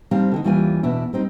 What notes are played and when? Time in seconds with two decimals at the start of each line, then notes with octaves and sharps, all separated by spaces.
0.11 F3 G3 C4 D#4 F5
0.32 D3 G3 D#4
0.44 D#2 E3 G3 D4 F4 G#5
0.83 E2 B2 D4 E4
1.13 G3 C4 D#4